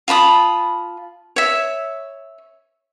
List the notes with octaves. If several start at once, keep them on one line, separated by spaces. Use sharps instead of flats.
F4 A5 B5 D#6
C#5 E5